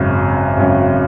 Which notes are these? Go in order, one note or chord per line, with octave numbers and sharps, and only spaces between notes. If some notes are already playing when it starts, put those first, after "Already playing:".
Already playing: G#1 F#2 C#3
G#1 F#2 C#3